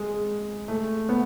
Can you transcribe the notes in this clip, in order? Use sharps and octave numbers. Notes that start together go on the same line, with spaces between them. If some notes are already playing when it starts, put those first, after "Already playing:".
Already playing: G#3
A3
B3